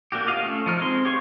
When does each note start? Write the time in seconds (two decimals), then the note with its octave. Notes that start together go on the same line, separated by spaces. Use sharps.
0.12 A#3 D4 F#4 G4
0.27 F4 D#5 F5
0.43 A3 C#4
0.66 F3 D#4 F6
0.80 G#3 C4 C6
1.05 G4 C#5 F5 C#6